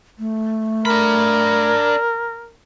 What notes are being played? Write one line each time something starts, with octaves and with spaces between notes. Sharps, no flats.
A3
D4 A#4 B5